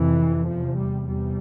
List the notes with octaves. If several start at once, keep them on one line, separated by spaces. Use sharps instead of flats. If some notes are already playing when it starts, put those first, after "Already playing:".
Already playing: F2 C3 E3
E2 C3 F3
G3
E2 C3 G3